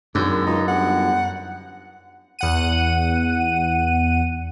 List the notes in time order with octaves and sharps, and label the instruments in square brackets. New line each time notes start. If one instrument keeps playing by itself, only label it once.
[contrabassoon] G#1 [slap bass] F#2 [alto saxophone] D3
[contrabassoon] C#2 [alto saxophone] D#4
[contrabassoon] G1 [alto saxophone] F#5
[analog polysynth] E2 F#5 D#7